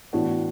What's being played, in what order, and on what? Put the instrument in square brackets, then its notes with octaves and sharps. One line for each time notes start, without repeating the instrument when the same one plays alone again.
[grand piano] A2 E3 B3 D4 F#4